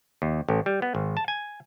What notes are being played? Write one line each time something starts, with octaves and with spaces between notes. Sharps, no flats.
D#2
A1
G3
B3
G#1
A5
G#5